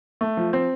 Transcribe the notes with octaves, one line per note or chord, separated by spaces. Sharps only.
A3
F3
C4